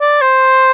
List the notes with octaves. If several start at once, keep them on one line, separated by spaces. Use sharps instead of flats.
D5
C5